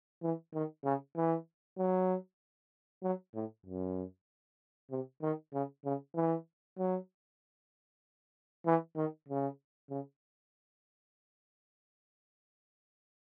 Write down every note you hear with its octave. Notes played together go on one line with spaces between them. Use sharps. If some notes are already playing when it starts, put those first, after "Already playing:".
E3
D#3
C#3
E3
F#3
F#3
A2
F#2
C3
D#3
C#3
C#3
E3
F#3
E3
D#3
C#3
C#3